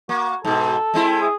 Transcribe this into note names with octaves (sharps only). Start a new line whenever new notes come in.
A#3 F#4
G#2 B2 A4
G#3 C4 E4
G#4